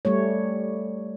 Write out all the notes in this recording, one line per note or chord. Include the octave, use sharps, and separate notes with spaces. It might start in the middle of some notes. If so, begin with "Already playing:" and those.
G3 A3 C#5